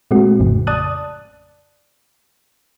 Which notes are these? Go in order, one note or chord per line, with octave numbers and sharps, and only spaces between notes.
A#2 G#3 A3 C4 F#4
A1 F2 A2 C#3
D5 A5 D#6 F#6